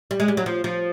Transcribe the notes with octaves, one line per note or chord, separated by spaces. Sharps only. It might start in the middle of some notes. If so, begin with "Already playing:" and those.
G3
G#3
G3
F#3
F3
F3